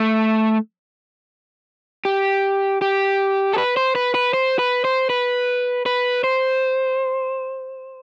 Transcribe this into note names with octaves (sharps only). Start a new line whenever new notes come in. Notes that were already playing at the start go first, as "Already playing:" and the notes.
Already playing: A3
G4
G4
A4
B4
C5
B4
B4
C5
B4
C5
B4
B4
C5